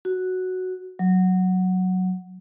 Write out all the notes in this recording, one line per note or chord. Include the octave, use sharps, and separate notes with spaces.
F#4
F#3